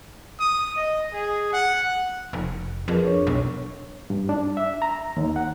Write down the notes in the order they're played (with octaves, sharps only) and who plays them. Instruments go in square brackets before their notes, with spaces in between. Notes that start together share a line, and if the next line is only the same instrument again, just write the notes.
[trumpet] D#6
D#5
G#4
F#5
[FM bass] F1
[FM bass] F2 [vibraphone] G#4 A#4 B4
[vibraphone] D4 C#5 C#6
[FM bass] B1
[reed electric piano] G2
D4
E5
A#5
D#2
F#5